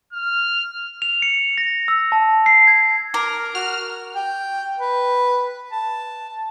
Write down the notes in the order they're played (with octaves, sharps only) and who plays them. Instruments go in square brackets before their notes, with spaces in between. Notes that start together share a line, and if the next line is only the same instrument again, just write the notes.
[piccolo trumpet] F6
[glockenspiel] F7
C#7
A#6
E6
A5
C7
G#6
[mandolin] A#4 [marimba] D6
[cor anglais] F#4 [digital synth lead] F6
[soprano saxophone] G5
B4
A5